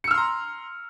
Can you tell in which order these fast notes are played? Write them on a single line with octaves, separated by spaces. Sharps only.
C#7 E6 F6 C6 A#5